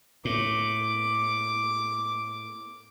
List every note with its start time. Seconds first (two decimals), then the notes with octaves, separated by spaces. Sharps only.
0.25 A2 D6